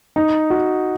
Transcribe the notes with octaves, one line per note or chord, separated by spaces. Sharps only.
D#4
F#4